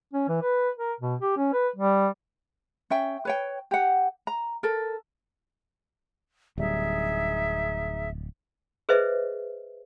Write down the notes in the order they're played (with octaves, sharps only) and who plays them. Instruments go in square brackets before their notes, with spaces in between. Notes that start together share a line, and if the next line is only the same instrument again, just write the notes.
[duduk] C#4
E3
B4
A#4
B2
G4
C#4
B4
G3
[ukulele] C#4 E5 G5
B4 C#5 G5
G4 F#5
A#5
A4 A#4
[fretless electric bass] D1 G3 [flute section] D#4 G#4 E5
[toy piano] G#4 B4 C5 D#5 E5